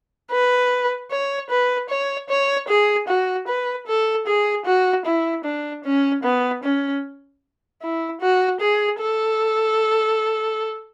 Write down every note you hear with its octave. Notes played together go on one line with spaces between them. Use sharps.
B4
C#5
B4
C#5
C#5
G#4
F#4
B4
A4
G#4
F#4
E4
D4
C#4
B3
C#4
E4
F#4
G#4
A4